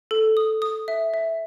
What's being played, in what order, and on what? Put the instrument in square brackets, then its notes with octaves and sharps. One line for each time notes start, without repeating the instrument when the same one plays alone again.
[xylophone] A4
D#6
D#6
E5
E5